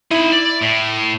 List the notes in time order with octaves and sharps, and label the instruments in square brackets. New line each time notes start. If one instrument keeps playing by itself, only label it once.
[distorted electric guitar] D#4 B5 [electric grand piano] E4
[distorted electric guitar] D5
A2